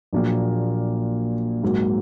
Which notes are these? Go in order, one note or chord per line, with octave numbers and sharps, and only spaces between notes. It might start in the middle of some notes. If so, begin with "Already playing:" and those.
A#1 A#2 F#3 A#3
G#2 F#3 A#3